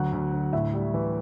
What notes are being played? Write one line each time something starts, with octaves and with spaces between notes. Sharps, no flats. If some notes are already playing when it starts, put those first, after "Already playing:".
Already playing: D2 F#3 F#5
D2
D2
A2 E5
G3
E3